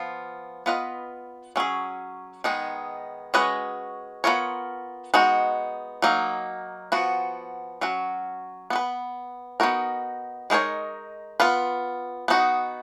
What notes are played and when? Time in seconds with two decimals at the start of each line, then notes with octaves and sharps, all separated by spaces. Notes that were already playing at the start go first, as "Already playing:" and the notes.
Already playing: F3 B3 F4
0.66 B3 F4 B4 D#5
1.56 F#3 C#4 G#4
2.44 D#3 G#3 B3 D#4
3.34 G#3 C#4 F#4 B4 D#5
4.24 B3 F4 A#4 C#5
5.14 G#3 B3 D#4 F#4
6.02 F#3 A#3 D#4
6.92 F3 B3 F#4
7.81 F#3 C#4 F#4
8.70 B3 F#4
8.76 B4
9.60 B3 D#4 F#4 A#4
10.50 G#3 D#4 F#4 A#4 C#5
11.40 B3 F4 B4
12.28 B3 D#4 F#4